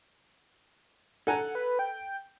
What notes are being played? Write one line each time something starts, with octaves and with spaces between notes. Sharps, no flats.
A4 F#5 G#5 A#5
B4
G5